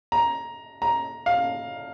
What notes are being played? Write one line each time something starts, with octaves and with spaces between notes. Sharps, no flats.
A#5
A#5
F5